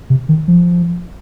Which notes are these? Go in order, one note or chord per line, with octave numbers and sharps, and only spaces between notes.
C3
D#3
F3